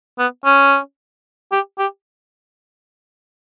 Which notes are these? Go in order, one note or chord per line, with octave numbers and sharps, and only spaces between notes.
B3
C#4
G4
G4